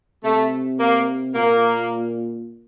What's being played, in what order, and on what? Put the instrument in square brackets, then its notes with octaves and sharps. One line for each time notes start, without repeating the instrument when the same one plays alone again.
[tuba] C3 [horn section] A3
[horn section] A#3
[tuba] A#2 [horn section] A#3